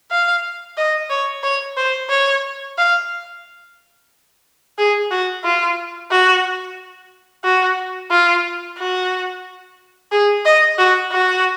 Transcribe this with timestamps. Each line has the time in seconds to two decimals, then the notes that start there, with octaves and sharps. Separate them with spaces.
0.11 F5
0.78 D#5
1.10 C#5
1.44 C#5
1.77 C5
2.10 C#5
2.78 F5
4.78 G#4
5.11 F#4
5.45 F4
6.11 F#4
7.44 F#4
8.11 F4
8.79 F#4
10.12 G#4
10.45 D#5
10.79 F#4
11.12 F#4